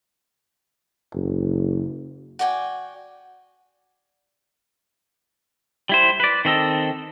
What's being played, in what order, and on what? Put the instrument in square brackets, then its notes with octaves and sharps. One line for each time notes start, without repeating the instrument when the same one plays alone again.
[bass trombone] F#1
[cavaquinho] F#4 D5 G5 G#5
[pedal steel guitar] G3 E4 C5
B4 D5
D#3 C4 A4 D#5